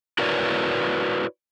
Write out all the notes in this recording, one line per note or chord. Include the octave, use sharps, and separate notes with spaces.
E4 F#4 A#4 B4 C#5 D5